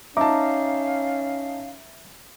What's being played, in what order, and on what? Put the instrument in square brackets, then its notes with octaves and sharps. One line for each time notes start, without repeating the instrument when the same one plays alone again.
[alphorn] C#4 [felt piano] D#4 A5 [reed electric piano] E5 A#5 D6 [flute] F5